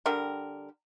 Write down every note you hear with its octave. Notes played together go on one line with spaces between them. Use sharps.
D3 G3 G4 A#4